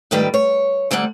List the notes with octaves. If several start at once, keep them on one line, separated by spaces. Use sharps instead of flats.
F2 G#2 D#3 G3 A3 B4
C#5
D2 G3 A#3 C4 F#5